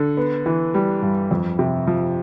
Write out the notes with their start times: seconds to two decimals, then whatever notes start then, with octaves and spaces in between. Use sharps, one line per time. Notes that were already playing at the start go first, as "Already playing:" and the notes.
Already playing: D3
0.17 B3
0.46 E3
0.74 G3
1.02 G2
1.31 F2
1.59 C3
1.87 F3